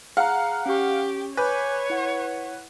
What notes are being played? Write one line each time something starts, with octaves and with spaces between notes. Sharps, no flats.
G#4 F5 F#5 A#5
C#4 G4 C#6
B4 C#5 G#5 D6 G6
E4 F#5 C#6